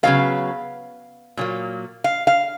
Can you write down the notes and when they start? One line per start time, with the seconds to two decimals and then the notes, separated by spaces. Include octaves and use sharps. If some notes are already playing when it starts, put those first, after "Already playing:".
0.03 C#3 F#3 B3 F5
1.37 A#2 F#3 A#3
2.04 F5
2.27 F5